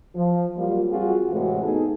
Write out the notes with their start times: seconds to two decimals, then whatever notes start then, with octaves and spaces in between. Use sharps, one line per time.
0.15 F3
0.58 F#3 G3 A#3 F4
0.90 G3 C4 F4 F#4 G#4
1.31 A2 C3 E3 G#3 F#4
1.63 A3 B3 D#4 G#4 A4